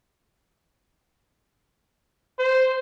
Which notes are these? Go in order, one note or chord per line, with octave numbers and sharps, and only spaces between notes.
C5